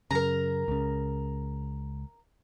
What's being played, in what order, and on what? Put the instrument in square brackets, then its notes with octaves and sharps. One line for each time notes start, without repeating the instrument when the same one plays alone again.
[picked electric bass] F#2 C#3 [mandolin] A#4 A#5
[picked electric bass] C#2 C#3